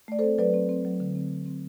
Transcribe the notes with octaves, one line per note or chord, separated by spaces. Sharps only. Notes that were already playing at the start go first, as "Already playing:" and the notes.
A3 D5
C4 A4 C5
F#3 B4 D5
C4
C4
F#3
D3
C4
D3
C4